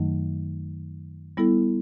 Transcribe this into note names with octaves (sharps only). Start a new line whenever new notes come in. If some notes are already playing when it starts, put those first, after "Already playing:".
Already playing: F#2 D#3 F#3 A3 D#4
G3 B3 E4 A4